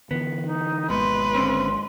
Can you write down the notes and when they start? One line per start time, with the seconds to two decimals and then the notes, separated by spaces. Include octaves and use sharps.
0.11 D3 E3 B3
0.46 D#4
0.90 G#1 B2 G#3 A#3 B4 C6
1.34 D3 C4 C#4